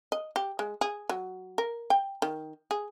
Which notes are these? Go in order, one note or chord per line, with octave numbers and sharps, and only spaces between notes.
D#5
G4
G#3
G#4
F#3
A#4
G5
D#3
G#4